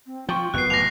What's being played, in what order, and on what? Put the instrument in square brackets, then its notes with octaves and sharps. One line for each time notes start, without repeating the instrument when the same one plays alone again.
[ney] C4
[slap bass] F3 [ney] F4 [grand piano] G5 C#6
[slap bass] F#1 F2 [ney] B3 [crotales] F#6 C7
[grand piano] D1 [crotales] A#6 F7